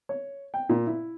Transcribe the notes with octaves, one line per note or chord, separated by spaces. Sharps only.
C#5
G5
A#2
E4